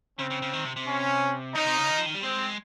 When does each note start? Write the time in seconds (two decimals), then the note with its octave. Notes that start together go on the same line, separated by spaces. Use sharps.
0.19 C#3 C4
0.30 C#3
0.42 C#3
0.53 D#3
0.65 C3
0.76 C3
0.87 C#4
1.55 C#3 D#4
1.66 C3
1.78 C#3
1.89 D#3
1.98 F3
2.06 D#3
2.14 G3
2.23 G#3 C4